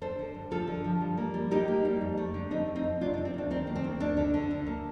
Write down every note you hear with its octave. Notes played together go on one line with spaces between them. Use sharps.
D3 A4 C5
D3
G2
F3 F4 A4
D3
F3
G3
A#3
G3
A#3 D#4 G4
A#3
G3
F2
A3
D3
A3 C4 D#4
F2
C4 D#4
F2
C3 D4 F4
D4
C3
C4
D2 D4
D#3 C4
A#3
C4
D2
D2 D4
D3
D3
D2
A#3